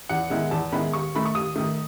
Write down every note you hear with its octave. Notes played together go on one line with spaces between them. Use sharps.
E2 F#5
D#3 G#3 B3 E4
E2 A5
D#3 G#3 B3 E4 B5
D#2 C#6
D#3 A3 B5
C#6
D#2 D#6
D#3 A3